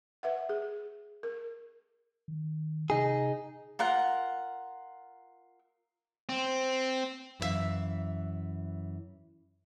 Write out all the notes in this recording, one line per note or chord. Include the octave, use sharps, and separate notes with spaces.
B4 E5 F#5
G#4
A#4
D#3
C3 D#4 G#4
F4 A#4 F#5
C4
F#2 E3 D4 E5 F5